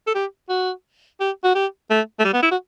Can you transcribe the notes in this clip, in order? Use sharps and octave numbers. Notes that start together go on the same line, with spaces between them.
A4
G4
F#4
G4
F#4
G4
A3
A3
G3
B3
E4
F#4